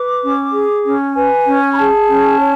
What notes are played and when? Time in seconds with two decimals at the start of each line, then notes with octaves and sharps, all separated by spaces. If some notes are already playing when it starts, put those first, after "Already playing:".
Already playing: B4 D6
0.21 C#4
0.53 G#4
0.85 C#4
1.15 B4 G#5
1.46 C#4
1.73 B5
1.78 G#4 A5
2.09 C#4
2.40 C#5